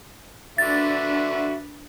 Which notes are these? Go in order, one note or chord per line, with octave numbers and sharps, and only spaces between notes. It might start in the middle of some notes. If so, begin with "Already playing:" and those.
D3 D4 F#4 B4 E5 A6